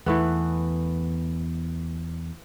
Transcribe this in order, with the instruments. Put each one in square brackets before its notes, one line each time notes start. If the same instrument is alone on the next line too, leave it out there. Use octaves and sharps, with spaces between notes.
[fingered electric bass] E2 [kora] E3 A3 B3